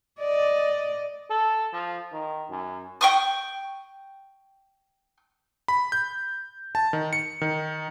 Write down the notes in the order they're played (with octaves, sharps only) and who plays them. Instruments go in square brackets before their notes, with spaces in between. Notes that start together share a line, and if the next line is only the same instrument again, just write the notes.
[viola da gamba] D5 D#5
[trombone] A4
F3
D#3
F#2
[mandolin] G5 C#6 D#6
[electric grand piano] B5
G6
A5
D#3
C#7
D#3